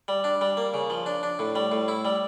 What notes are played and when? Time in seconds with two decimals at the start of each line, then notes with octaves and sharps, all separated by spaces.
0.08 G3
0.24 D4
0.41 G3
0.57 A#3
0.74 C#3
0.90 F3
1.06 D4
1.23 D4
1.39 A2
1.56 G3
1.72 A2
1.88 E4
2.05 G3